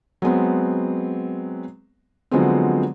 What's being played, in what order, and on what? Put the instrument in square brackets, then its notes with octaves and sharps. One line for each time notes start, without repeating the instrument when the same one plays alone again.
[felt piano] F#3 G#3 B3 C4
D3 F3 F#3 G#3 B3 C4